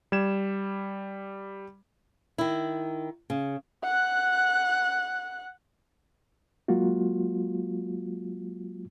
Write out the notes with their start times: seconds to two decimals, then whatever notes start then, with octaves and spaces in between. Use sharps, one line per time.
0.12 G3 G#6 E7
2.38 D#3 E4
3.30 C#3
3.84 F#5 F#6
6.68 F#3 G#3 A#3 F4 F#4